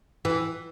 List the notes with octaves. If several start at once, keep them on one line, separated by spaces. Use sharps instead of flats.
E3